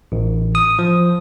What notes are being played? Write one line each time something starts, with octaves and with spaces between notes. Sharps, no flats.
A1
D#6
F3